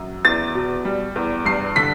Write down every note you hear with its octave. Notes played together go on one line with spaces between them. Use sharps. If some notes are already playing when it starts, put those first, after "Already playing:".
Already playing: F#2 F#3
E2 A6
B2
G3
E2
G2 C7
D3 B6